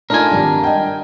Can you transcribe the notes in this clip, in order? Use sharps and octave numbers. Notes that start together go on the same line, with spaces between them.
A3 D4 D#4 F4 A#4 G#5
G#1 G3
D#5 G5